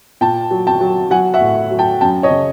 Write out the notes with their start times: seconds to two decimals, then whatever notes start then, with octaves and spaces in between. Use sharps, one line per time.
0.21 A#2 G5 A5
0.51 F#3
0.67 G5 A5
0.81 F#3
1.11 F#3 F#5 G#5
1.34 E5 F#5
1.41 A2
1.71 F#3
1.79 G5 A5
2.01 F#2 G5 A5
2.23 C#5 D#5
2.30 C#3